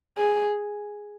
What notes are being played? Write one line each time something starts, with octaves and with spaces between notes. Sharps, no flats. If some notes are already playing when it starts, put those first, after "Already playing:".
G#4